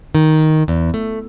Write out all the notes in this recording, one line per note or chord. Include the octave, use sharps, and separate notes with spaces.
D#3
E2
A3